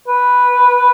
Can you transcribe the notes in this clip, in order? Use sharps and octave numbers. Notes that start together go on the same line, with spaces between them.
B4